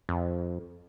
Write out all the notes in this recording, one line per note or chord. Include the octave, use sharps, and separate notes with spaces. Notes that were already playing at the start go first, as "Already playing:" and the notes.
F2